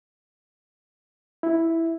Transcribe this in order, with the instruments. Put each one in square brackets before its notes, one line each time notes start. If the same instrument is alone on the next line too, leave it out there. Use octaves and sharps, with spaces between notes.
[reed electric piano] E4